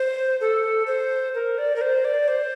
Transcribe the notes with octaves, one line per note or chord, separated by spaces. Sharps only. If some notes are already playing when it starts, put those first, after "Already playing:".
Already playing: C5
A4
C5
A#4
D5
A#4
C5
D5
C5